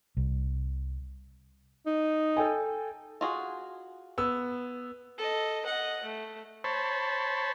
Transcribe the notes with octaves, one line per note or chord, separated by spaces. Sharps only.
C2
D#4
A4 G5 G#5
F4 F#4 G#4
B3 E6
A4 D#5
D#5 F#5
A3
C5 C#5 A5 B5